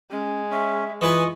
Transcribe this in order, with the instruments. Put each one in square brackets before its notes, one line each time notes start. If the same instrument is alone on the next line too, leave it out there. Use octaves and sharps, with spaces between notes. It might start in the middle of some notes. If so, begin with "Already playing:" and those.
[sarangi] G#3 [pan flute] C#4
[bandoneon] C#4 [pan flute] E5
[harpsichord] E3 B4 G#5 [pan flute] F4 [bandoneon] D#5 C#6 D#6